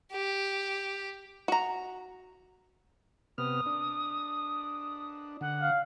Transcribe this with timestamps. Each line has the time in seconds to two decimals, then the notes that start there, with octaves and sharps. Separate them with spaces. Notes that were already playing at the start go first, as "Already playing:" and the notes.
0.12 G4
1.48 F#4 A#5
3.38 C3 B3 D#6 F6
3.66 D4
5.41 D3 F#5
5.62 F5